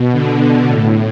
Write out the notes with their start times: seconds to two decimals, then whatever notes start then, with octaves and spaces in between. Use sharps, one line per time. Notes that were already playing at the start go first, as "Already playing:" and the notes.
Already playing: B2
0.12 D3
0.67 A2